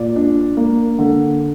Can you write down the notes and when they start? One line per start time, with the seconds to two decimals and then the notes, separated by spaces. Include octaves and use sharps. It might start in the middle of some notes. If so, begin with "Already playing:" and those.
Already playing: A#2 D5
0.16 D4
0.57 A#3
0.99 D3